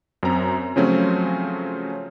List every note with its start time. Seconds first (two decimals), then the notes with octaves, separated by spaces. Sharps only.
0.23 F#2 C4 A#5
0.76 C#3 F3 F#3 A3 C4 C#4